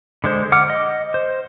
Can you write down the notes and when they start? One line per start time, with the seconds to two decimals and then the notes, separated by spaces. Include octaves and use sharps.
0.24 D3 G#3 C5
0.52 F#5 D6 F6
0.70 D#5
1.14 C5